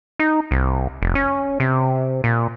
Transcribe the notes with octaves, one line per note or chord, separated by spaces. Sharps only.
D#4
C2
F1
C#4
C3
A#2